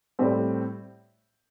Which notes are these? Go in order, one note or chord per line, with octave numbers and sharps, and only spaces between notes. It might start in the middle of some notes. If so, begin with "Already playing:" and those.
A2 G3 C4